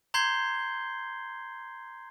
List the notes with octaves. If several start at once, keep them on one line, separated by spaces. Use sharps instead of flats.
A#5 C6 G6 G#6 C7 G7